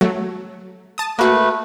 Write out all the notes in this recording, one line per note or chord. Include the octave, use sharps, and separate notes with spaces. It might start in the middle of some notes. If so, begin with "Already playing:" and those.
F#3 A3
A5 D#6
A3 A#3 F#4 B4